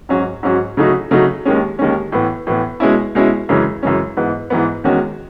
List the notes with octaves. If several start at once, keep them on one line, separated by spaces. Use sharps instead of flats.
G#2 F#3 C#4 F#4
G#2 F#3 C#4 F#4
C#3 F#3 A3 D#4 F#4
C#3 F#3 A3 D#4 F#4
D#2 D#3 G#3 C#4
D#2 D#3 G#3 C#4
A2 E3 B3
A2 E3 B3
B2 G#3 C#4 E4
B2 G#3 C#4 E4
F#2 C#3 E3 G#3 C#4
F#2 C#3 E3 G#3 C#4
G#2 E3 B3
G#2 E3 B3
E2 D#3 G#3 C#4 F#4